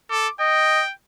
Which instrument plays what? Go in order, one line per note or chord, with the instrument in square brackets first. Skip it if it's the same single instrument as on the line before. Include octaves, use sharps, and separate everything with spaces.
[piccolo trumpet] A4 [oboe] D6
[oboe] D#5 [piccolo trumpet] G5